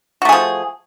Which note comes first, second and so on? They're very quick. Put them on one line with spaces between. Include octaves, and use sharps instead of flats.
F#4 A3 G#4 F3